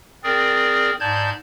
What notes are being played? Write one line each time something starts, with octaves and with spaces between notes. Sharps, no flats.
C4 G#4 A#4 D5
G#2 D5 A5 G6 G#6